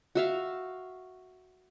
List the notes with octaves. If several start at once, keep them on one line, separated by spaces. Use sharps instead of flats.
F#4 E5 F5